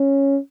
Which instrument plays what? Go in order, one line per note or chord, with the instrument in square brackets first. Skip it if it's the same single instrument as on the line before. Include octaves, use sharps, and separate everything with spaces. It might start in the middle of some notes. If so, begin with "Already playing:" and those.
Already playing: [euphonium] C#4